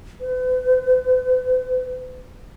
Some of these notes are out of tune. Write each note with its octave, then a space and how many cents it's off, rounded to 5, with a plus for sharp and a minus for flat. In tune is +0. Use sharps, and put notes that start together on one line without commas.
B4 +45